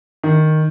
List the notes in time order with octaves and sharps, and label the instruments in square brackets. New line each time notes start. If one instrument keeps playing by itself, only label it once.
[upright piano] D#3